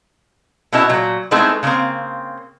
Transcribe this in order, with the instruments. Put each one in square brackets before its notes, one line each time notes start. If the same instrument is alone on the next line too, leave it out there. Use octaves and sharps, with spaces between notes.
[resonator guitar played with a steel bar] B2 B3 C#4 E4 D#5 A5
A#2 F#3
G#3 A3 B3 C4 D#4 E4
C#3 F3 G#3 A#3 C4